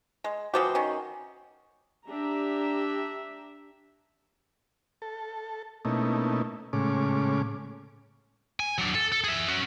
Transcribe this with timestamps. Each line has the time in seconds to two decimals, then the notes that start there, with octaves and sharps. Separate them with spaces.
0.24 G#3
0.54 E3 F3 F#4 G4 C5 D#6
0.75 D#3 C#4
2.08 D4 G4 E5 A#5
5.02 A4
5.85 B2 A3 A#3 C#4 D#4 E4
6.73 A2 C#3 G#3 C#4 D6
8.60 G#5
8.78 F#3 D4
8.95 A4
9.12 A4
9.24 G#4 E5
9.48 C#4 F#4